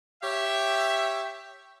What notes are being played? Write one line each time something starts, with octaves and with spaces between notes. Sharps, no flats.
G4 C#5 E5